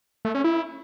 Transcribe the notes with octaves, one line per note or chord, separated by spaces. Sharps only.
A3
C#4
E4